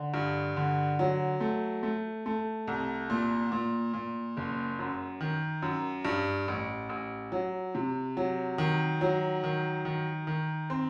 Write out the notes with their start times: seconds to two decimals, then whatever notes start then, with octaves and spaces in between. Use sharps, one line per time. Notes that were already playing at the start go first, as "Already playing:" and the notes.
Already playing: D3
0.14 G2
0.57 D3
0.99 F#3
1.40 A3
1.83 A3
2.26 A3
2.68 C2
3.10 A#2
3.52 A#2
3.94 A#2
4.37 F#1
4.79 F#2
5.21 D#3
5.62 F#2
6.05 G2
6.48 A1
6.89 A1
7.32 F#3
7.75 C3
8.17 F#3
8.58 D#3
9.01 F#3
9.44 D#3
9.85 D#3
10.27 D#3
10.70 C4